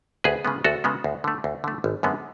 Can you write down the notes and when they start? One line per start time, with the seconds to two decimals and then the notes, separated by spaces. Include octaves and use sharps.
0.24 D2 G#4 B4
0.45 C#3 G#3 B3
0.64 D2 F#4 A4
0.84 C#3 G#3 B3
1.04 D2
1.24 D3 A3
1.44 D2
1.64 D3 A3
1.84 G#1
2.03 F#2 D3 G#3 B3